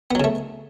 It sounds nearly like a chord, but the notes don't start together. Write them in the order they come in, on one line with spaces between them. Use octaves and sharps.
B3 F#3 C#3 A3